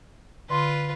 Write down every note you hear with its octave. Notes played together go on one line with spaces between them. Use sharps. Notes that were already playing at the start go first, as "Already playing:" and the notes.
D3 F4 B4 C6